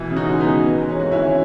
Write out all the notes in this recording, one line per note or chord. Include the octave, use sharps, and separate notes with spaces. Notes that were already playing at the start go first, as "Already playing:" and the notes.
Already playing: B2 E3
C#3
D#4 F#4
G#3
B3 D#4
E3
E3
G#3
C#4
G#1 F#4
C#4 E4
E3